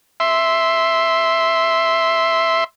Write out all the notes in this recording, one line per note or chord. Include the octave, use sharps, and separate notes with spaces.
E5 C6